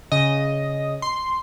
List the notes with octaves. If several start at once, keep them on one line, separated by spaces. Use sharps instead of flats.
C#3 D#5
C6